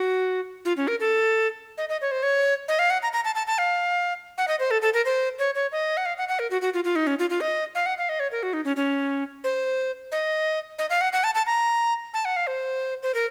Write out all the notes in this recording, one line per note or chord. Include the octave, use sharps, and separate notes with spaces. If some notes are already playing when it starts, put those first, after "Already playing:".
Already playing: F#4
F4
C#4
A#4
A4
D#5
D#5
C#5
C5
C#5
D#5
F5
F#5
A#5
A#5
A5
A5
A5
F5
F#5
D#5
C5
A4
A4
A#4
C5
C#5
C#5
D#5
F#5
F5
F#5
F#5
A#4
F#4
F#4
F4
F4
D#4
C#4
F4
F4
D#5
F5
F#5
F5
D#5
C#5
A#4
F#4
D#4
C#4
C#4
C5
D#5
D#5
F5
F#5
F#5
A5
A5
A#5
A5
F#5
F5
C5
C5
A#4